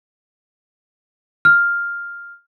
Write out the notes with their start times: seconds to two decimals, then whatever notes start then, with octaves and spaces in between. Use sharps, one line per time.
1.45 F6